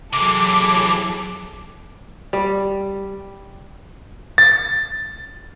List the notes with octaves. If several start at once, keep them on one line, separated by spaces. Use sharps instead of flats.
C3 E3 F#3 G#4 A4 D6
G3
A6